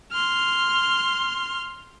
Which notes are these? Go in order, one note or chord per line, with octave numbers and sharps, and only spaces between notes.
C6 F6